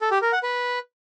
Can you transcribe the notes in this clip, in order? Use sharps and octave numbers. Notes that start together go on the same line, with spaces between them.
A4
G4
A#4
F#5
B4